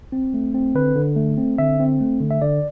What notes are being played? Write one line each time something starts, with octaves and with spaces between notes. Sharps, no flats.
C4
A3
C4
D3 B4
D3
A3
C4
D3 E5
C4
A3
D3
E5
D3 D5